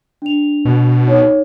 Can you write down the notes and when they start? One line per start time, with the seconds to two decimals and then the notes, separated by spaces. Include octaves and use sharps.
0.22 D4 F7
0.65 B2
1.07 D#4 C#5